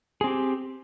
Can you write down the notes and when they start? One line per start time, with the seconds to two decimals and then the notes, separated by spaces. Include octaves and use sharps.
0.21 G#4
0.24 C4
0.27 G4